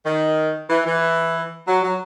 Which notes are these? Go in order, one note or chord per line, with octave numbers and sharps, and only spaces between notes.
D#3
E3
E3
F#3
F#3